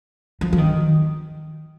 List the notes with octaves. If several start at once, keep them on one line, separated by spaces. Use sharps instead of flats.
F3
F3
D#3